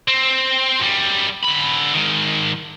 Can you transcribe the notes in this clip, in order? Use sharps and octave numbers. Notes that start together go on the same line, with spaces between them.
C4
F#2 G3
D3 B5
G#2 D#3